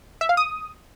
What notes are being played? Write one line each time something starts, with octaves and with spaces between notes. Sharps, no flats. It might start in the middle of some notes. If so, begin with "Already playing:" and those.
E5
F5
D#6